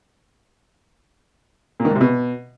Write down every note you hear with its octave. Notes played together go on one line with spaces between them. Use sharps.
A#2
D#3
G#2
C3
B2